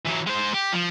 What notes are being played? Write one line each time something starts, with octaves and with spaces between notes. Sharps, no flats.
E3 F#3
G#3 C5
G4
F3